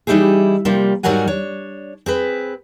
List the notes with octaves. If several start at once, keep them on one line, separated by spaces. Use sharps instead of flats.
E3 G3 D#4 E4 G4 G#4
C3 F3 G3 A#3
G#2 F#3 G3 A#4 F#5 G#5
D4 C#5
C4 G#4 B4